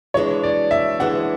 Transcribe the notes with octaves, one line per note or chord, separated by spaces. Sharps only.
E3 G#3 D4 C#5
D5
E5
E3 G#3 D4 F#5